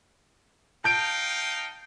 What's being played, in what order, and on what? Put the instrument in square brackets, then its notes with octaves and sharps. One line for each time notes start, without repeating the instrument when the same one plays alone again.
[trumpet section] D#4 F5 G5 [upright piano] A5 G6 D7